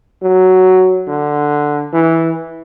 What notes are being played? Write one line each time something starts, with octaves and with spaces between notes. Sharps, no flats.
F#3
D3
E3